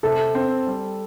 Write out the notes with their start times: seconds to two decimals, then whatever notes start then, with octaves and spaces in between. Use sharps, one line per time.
0.03 C3 A4
0.35 C4
0.67 G3